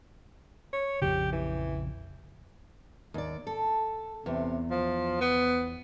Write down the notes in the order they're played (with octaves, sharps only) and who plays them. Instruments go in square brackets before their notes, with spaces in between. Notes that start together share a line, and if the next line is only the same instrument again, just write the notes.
[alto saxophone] C#5
[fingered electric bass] A#1 F2 C#3 [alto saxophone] G4
[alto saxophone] E3
[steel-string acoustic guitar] D#2 D5
A4
[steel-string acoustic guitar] E2 [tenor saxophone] C3
[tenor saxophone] F3
B3